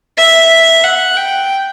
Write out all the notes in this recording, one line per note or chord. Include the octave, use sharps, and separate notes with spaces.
E5
F#5
G5